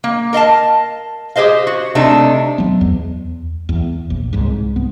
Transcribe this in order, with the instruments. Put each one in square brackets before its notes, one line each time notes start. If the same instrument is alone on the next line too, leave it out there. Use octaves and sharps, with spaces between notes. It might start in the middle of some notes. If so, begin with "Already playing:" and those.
[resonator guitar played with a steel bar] A#3
A#4 D#5 F5 A5
G4 G#4 C5 D#5 F5
F#4
C3 A3 D4 D#4
[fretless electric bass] F#3 B3
E2
E2
A#1
C2 G#2
B3